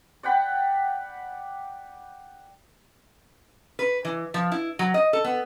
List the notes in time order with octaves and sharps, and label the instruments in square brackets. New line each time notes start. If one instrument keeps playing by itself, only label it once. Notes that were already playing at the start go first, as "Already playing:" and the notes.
[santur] D5 F#5 G5 B5
[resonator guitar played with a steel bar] B4
E3
F3
E4
F#3
D#5
A4
B3